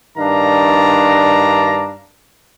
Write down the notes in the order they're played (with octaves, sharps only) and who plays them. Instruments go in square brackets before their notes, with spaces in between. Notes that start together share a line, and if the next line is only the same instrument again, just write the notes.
[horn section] G2 D#3 D4 F5 A#5